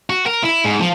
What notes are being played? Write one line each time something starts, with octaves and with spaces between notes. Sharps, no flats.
F#4
A#4
E4
G#2
F3